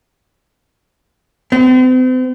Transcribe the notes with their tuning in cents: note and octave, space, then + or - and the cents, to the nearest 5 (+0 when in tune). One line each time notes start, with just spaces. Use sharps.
C4 -40